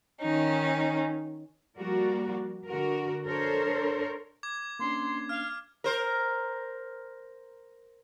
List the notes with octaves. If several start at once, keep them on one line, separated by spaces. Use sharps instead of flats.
D#3 C#4 D#4
F3 G3 A#3 F#4 A#4 D5
D3 F#4 A#4
D4 A4 A#4 C5 C#5
D6 G#6
A#3 C#4 D4 C6
F5 F6
A#4 C5